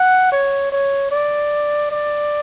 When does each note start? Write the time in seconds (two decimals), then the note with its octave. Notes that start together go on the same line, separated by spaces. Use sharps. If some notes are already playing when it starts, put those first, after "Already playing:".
Already playing: F#5
0.32 C#5
0.72 C#5
1.11 D5
1.91 D5